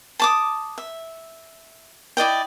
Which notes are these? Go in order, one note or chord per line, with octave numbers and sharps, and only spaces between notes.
A5 D6 D#6
E5
E4 D5 D#5 G5